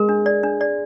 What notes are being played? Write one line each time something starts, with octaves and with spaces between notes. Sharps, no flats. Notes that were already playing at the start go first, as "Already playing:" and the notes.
Already playing: G#3 A#4
D4
D5
D4
D5